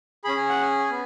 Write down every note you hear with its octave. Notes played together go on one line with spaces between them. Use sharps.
C#4 G#4 B5
G#5
F#5
G#5
B3